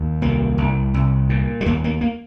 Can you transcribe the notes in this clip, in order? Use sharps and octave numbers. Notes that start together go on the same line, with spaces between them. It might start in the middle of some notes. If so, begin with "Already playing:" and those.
Already playing: D#2
C2 A#3
C2
C2
A#2
G3
D#2 A#3
A#3
A#3